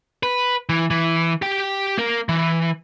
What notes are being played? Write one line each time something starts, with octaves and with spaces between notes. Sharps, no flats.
B4
E3
E3
G4 G5
A#3 A#4
E3